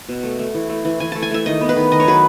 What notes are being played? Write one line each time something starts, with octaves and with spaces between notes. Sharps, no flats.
B2
A3
A3
E3
A3
E3
E3 G#5
A3 A5
G#5
A3 E5
D#3 D#5
B3
B4
D#3
D#3 D#5
C#5
F#3 B4